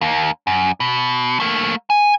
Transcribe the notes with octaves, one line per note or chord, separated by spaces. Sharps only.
D#2 A#3
F#2
B2
A3 A#3
G#5